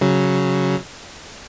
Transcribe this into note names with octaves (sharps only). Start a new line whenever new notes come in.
C#3 F#3